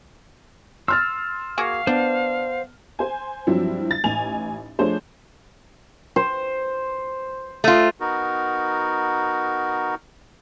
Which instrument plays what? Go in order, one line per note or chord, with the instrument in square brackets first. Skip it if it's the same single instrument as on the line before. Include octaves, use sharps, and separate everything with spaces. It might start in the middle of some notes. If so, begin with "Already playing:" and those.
[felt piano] C6 F6 A6 [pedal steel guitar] E6
[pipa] A#3 F#4 G#4 [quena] F5
[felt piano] B3 [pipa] D4 [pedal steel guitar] C5
[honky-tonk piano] C5 G#5
G2 F3 F#3 C4 D4 E4
A6
A1 D#4 G#5 F7
F3 A3 D4 G#4 C5 C#5
[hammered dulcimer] C5
[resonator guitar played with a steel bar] A3 F4
[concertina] B3 D#4 F#4 A#4